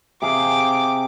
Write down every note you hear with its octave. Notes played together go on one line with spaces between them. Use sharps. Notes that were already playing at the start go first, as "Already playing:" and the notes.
C3 G#4 F5 D6